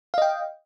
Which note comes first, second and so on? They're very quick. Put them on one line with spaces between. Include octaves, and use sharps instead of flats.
F5 D#5 G5